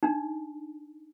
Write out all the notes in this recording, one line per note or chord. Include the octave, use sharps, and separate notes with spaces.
D4 D#4